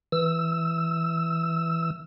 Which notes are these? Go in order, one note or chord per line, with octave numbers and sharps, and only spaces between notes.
E3 E6